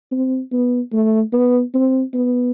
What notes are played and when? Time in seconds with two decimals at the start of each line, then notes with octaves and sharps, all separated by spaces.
0.11 C4
0.52 B3
0.92 A3
1.33 B3
1.74 C4
2.13 B3